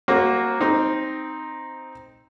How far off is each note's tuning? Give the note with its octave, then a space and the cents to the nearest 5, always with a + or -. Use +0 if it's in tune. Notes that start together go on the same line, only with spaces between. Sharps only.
A#3 +0 C#4 -45 F#4 +0
C4 +0 D#4 +0